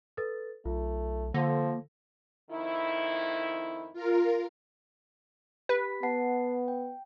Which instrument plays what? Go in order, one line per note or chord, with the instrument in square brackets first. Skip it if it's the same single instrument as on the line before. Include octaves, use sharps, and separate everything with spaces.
[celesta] A4 B4 A6
[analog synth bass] B1 [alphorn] A3 [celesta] F4
[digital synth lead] D3 [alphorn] F3 [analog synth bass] A#3 [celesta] A#6
[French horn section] F2 D#3 E4
[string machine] F4 A#4
[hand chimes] G4 B5 B6 [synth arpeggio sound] B4
[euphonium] B3 [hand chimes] F#5 A5 C7
[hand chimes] G5